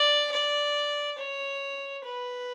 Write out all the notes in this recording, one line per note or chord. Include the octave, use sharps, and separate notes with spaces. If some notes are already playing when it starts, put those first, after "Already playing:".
Already playing: D5
D5
C#5
B4